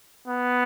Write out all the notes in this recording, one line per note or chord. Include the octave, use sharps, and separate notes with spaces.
B3